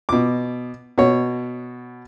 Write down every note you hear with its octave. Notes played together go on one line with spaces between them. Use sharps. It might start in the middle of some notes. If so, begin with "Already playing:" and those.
B2 D6
B2 F#4 C#5